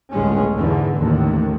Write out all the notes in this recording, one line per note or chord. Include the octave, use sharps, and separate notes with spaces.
G1 C#2 A2 G#3 C#4
E2 G#2 D3 E3
A1 D#2 A2